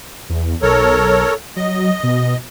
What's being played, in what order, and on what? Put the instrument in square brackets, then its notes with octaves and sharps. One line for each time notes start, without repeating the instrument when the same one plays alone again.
[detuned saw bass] E2
[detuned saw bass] B1 [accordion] A4 A#4 C#5
[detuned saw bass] F#3 [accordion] D#5
[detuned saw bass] B2